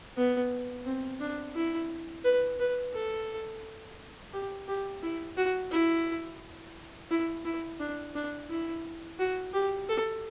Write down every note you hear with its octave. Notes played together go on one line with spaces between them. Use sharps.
B3
C4
D4
E4
B4
B4
A4
G4
G4
E4
F#4
E4
E4
E4
D4
D4
E4
F#4
G4
A4